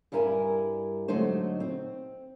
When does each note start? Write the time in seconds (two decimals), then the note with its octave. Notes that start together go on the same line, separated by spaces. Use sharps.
0.12 G2 G3 E4 A#4 G#5
1.08 G#2 D3 F#3 A3 D#4 C5
1.60 C4